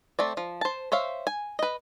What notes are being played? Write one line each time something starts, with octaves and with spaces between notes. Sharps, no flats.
A3 C4 D5
F3
C5 A5
C5 C#5 E5 F5
G#5
B4 D#5